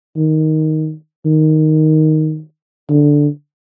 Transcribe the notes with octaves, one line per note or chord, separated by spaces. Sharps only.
D#3
D#3
D3